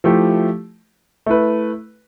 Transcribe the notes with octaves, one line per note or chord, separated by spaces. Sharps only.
F3 A3 E4 G4
A3 E4 B4